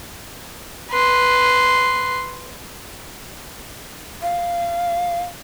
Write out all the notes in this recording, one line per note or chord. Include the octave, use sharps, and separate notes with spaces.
B4 C6
F5